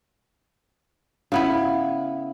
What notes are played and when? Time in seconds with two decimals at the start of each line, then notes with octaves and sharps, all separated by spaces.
1.32 C#3 B3 E4